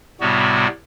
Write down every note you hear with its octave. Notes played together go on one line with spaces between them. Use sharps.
A2 C3 G3 B3 F#4